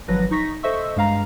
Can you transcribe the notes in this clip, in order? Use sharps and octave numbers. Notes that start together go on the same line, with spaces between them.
G#1 F3 F#3 B4 A#6
D#4 C#6 A#6 B6
A4 C5 D#5 E5 C#6 E6
G2 G#3 F5 A#5